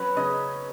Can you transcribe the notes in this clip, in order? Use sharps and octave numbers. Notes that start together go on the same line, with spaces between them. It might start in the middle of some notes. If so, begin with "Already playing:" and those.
Already playing: F#3 C#4 B4 C#5
C#3 D#5